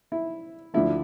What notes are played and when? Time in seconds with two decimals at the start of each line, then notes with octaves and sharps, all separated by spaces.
0.12 E4
0.74 D2 D3 F3 A3 E4